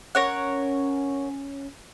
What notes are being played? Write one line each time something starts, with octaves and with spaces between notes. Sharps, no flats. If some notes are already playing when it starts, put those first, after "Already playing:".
C#4 A#4 C#5 F#5